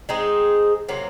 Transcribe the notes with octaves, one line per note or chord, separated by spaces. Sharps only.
G#3 C4 D#4 G#4
C3 F#3 A#3